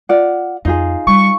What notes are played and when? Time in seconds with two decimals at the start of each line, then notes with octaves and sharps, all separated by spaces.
0.09 F4 D5 F#5
0.65 F2 D#4 F4 G#4
1.07 G3 C#6